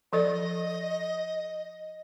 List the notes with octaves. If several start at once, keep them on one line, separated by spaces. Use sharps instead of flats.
F3 A4 D5 D#5